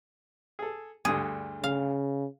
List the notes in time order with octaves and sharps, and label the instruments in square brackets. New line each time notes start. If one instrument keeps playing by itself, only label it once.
[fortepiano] G#4 A4
[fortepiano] D2 G2 D3 [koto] G#4
[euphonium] C#3 [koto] F5